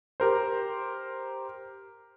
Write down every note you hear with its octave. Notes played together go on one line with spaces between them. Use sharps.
G4 A#4 C5